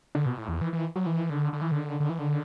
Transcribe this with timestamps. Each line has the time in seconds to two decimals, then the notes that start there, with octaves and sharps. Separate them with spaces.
0.15 D3
0.26 B2
0.38 A2
0.48 E2
0.61 E3
0.73 E3
0.96 F#3
1.06 E3
1.30 D3
1.53 D3
1.61 E3
1.72 D3
2.00 D3
2.10 E3
2.19 D3